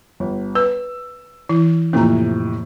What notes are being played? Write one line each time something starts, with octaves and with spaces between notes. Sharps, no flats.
G1
B4 E6
E3 E4
F2 A2 C3 A#3 A#5